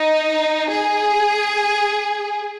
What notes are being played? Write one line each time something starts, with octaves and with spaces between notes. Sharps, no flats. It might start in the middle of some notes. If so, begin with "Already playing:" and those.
Already playing: D#4
G#4